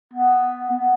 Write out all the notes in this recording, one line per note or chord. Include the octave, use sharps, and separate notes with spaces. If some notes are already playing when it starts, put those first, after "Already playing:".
B3
B3